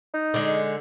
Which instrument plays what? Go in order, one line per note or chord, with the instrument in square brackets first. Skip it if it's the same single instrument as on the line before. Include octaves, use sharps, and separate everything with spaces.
[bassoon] D#4
[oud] D3 G#3